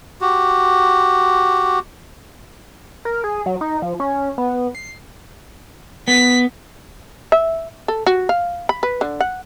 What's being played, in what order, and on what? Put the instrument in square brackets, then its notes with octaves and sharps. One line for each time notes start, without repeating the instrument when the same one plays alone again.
[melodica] F#4 G4
[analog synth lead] A#4
G#4
F#3
D#4
F3
C#4
B3
C7
[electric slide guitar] B3 [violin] B6
[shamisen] E5
A4
F#4
F5
B5
B4
D3
F#5